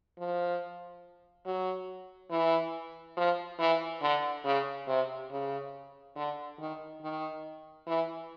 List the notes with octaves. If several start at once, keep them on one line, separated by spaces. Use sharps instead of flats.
F3
F#3
E3
F3
E3
D3
C#3
C3
C#3
D3
D#3
D#3
E3